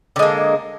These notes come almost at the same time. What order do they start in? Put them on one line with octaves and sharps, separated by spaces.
D3 G#3 A#3